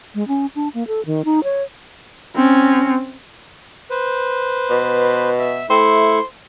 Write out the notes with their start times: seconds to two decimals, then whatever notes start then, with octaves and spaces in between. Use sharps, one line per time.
0.15 G#3
0.28 C#4
0.55 D4
0.74 A#3
0.87 A4
1.06 D#3
1.25 D#4
1.44 C#5
2.36 C4 C#4
3.90 B4 C5
4.70 B2
5.39 E5
5.70 A3 E4 C5 C#6